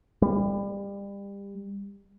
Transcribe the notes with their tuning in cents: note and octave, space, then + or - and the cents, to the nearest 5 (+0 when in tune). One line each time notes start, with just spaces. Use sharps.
G3 +30